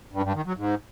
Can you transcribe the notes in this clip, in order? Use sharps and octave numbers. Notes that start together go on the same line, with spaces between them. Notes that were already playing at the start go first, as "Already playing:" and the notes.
G2
G2
D#3
F#3
G#2